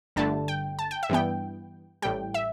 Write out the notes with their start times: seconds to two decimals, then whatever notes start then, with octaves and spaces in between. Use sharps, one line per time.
0.16 G1 G2 D3 A3 A5
0.48 G5
0.79 A5
0.91 G5
1.03 E5
1.09 G2 E3 B3 G5
2.02 A1 A2 G3 G5
2.34 E5